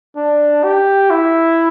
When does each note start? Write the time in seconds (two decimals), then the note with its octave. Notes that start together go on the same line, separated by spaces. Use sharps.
0.16 D4
0.63 G4
1.10 E4